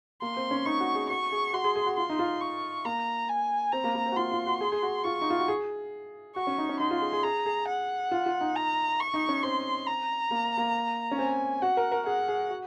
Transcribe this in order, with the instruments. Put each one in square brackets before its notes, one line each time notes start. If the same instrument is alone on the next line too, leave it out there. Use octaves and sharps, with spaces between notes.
[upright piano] A#3 [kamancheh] C6
[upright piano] C4
C#4
[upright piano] D#4 [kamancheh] C#6
[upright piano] F#4
G#4
[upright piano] F#4 [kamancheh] C#6
[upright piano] G#4
[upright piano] F#4 [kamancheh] C6
[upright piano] G#4
G#4
F#4
[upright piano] F4 [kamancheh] C6
[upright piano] D#4
F4
[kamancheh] C#6
[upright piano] A#3 [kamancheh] A#5
[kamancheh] G#5
[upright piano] C4 [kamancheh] A#5
[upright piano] A#3
A#3
C4
F#4
[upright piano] F4 [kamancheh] C6
[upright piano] F4
F#4
G#4
G#4
F#4
[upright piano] F4 [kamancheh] C#6
[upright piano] D#4
F4
F#4
G#4
[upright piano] F#4 [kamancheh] C#6
[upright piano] C#4
D#4
C#4
[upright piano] D#4 [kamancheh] C6
[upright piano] F4
G#4
G#4
[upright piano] G#4 [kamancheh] A#5
[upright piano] G#4
[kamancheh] F#5
[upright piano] F4
F4
D#4
[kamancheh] A#5
C#6
[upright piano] D#4
C#4
[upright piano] C4 [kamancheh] C6
[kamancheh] A#5
[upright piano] A#3
A#3
C#4
[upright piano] C4 [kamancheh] G#5
[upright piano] F#4 [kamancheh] F#5
[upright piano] A#4
A#4
[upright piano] G#4 [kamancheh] F#5
[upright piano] G#4
F#4